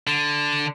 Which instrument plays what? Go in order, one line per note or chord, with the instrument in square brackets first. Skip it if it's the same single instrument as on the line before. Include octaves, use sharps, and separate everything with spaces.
[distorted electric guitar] D3